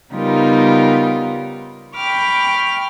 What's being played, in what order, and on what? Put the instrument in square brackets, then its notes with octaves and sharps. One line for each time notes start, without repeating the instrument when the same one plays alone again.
[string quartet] C#3 G3 B3 D#4 F4 A#4
G5 B5 C#6 D6 F6